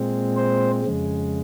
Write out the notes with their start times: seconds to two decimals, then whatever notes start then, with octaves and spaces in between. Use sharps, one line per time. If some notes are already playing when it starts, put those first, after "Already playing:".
Already playing: A#2 G#3 C4
0.37 C5
0.85 F2 C#3 G#3